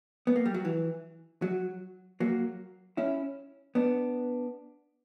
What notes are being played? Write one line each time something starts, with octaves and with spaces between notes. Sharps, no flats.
B3
A#3
G3
F#3
E3
F#3
F#3 A#3
C#4 E4
B3 D4